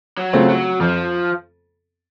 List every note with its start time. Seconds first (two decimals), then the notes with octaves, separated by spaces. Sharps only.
0.17 F#3
0.33 C#3 A3 C4 F4
0.49 F#3
0.80 F2 F3